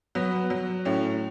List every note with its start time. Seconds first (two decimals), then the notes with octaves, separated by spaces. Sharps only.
0.15 F#3 B3
0.50 F#3
0.85 A2 C#4